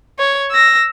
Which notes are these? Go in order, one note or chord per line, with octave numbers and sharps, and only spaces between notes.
C#5
E6 A#6